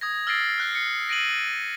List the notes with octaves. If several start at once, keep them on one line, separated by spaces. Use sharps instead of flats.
D#6 G#6 A#6
E6 F6 A6 A#6 C7 D7
F6 F#6 A#6
C7 C#7
A#6 D7 D#7 F#7